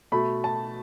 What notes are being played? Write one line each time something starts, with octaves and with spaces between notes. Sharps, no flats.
B2 A3 B5
A5